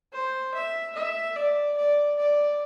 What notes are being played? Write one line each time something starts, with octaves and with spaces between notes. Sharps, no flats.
C5
E5
E5
D5
D5
D5